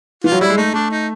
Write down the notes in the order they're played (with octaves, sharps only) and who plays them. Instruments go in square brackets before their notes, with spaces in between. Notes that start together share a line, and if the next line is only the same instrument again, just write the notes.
[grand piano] E3 [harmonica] F4
[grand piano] F#3
[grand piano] G3 [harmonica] E4
[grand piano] G#3
[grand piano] A3 [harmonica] D#4
[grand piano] A3 [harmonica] D4
[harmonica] D#4